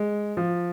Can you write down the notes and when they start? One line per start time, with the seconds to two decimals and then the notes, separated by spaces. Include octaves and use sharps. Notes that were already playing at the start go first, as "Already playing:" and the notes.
Already playing: G#3
0.37 F3